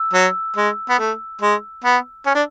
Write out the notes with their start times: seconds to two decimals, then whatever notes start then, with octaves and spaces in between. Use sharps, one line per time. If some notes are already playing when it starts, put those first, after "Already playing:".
Already playing: E6
0.14 F#3
0.56 G#3
0.89 B3
0.99 A3
1.42 G#3
1.84 B3
2.26 C#4
2.35 D4